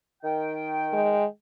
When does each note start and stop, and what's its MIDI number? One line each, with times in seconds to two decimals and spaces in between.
0.23 1.24 51
0.23 1.24 79
0.93 1.25 56